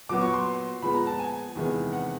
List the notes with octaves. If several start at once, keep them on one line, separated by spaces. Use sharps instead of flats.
A#2 F#3 B3 D6
C#6
C6
A#2 F3 G#3 B3 B5
A#5
A5
G#5
E2 C3 D#3 G#3 B3
F#5